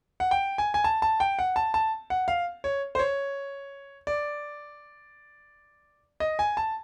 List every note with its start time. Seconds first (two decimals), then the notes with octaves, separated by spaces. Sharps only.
0.20 F#5
0.31 G5
0.58 G#5
0.74 G#5
0.84 A5
1.02 A5
1.20 G5
1.39 F#5
1.56 A5
1.74 A5
2.10 F#5
2.28 F5
2.64 C#5
2.95 C5
2.99 C#5
4.07 D5
6.20 D#5
6.39 G#5
6.57 A5